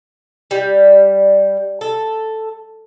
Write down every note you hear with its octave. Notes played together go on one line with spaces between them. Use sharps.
G3
A4